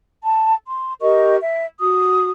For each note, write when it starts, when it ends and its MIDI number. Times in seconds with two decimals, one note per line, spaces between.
0.24 0.54 81
0.67 0.94 84
1.01 1.36 67
1.01 1.36 70
1.01 1.36 75
1.01 1.36 85
1.42 1.65 76
1.79 2.30 66
1.79 2.30 87